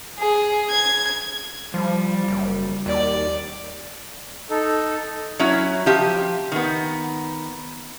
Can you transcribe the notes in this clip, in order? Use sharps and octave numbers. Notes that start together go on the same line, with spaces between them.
G#4
G#6
F3 G3
F#1
D#2 D5
D#4 A4
F#3 C#4 E4
F3 G4 E5
D#3 B3